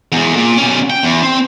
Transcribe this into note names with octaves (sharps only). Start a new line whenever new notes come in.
E2 G#3
A#2
B2 C#4
G5
E2
C4